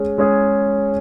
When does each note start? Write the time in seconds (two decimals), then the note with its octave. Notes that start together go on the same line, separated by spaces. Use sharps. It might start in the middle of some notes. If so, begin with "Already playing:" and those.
Already playing: G#3 C#4 G#4
0.18 G#3 C#4 G#4